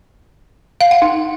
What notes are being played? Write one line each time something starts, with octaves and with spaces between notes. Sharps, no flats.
F5
F#5
D#4